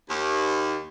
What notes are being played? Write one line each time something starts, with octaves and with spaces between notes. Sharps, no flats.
D#2